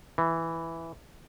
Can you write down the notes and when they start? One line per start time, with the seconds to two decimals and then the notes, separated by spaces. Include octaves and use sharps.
0.18 E3